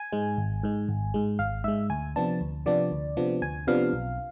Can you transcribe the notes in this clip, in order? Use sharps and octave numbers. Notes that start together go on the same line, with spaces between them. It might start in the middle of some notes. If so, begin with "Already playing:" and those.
Already playing: G#5
G#2 G#3
G#1
G#2 G#3
G#1
G#2 G#3
G#1 F5
G#2 G#3 E5
D2 G#5
C3 F3 B3 D4 A5
D2
C3 F3 B3 D4 D5
D2
C3 F3 B3 D4
D2 G#5
C3 F3 B3 D4 F5
B1